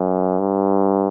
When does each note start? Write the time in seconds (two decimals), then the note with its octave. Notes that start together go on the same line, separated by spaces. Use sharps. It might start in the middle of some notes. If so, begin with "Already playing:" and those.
Already playing: F#2
0.39 G2